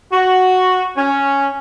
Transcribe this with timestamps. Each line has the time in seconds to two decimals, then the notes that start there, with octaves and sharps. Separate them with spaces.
0.13 F#4
0.97 C#4